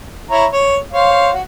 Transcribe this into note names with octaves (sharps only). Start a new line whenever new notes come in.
E4 C#5 A#5
C#5
C5 C#5 F5
F#4